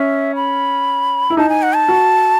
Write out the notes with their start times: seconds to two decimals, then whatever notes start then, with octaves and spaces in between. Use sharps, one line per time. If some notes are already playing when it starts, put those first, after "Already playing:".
Already playing: C#4 E5
0.35 B5
1.30 E4
1.37 D#4 A5
1.49 G#5
1.63 F#5
1.75 A5
1.88 F#4